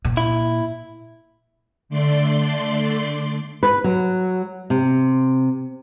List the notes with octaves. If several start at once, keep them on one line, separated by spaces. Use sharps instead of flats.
A#2
E4
D3 A3 D5 C6
B4
F#3
C3